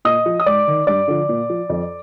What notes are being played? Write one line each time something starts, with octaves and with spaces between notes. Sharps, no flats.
A#2 D#5 D#6
F3
D#6
G#2 D5 D6
D#3
G2 D5 D6
D3 F3
A#2
F3
F2